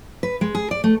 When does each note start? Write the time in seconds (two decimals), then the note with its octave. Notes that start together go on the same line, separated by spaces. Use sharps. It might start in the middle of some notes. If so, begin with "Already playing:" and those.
0.23 B4
0.41 G#3
0.55 G#4
0.71 D5
0.84 A3